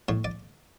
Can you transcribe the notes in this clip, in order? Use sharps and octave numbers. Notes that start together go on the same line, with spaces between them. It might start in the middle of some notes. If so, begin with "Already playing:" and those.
A2 C#5
D5